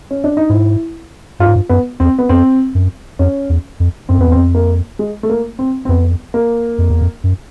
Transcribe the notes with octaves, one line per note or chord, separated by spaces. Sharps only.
C#4
D4
D#4
G#2 E4
G2 F4
G#2
G2
F#2 B3
E2 C4
B3
F2 C4
F#2
F2 C#4
E2
F2
F#2 C4
F2 B3
E2
C4
F2
A#3
G#3
A3
A#3
C4
C4
F2 B3
A#3
F2
E2
F2
F#2